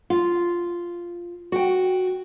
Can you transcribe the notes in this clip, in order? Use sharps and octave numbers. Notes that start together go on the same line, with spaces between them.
F4
F#4 G5